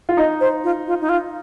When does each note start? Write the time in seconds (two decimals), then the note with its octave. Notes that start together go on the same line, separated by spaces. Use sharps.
0.09 F4
0.17 D#4 D#5
0.41 C5
0.64 F4
0.87 F4
1.01 D#4
1.09 F4